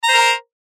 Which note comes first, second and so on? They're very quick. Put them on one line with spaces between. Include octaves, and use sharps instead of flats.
A#5 C5 A#4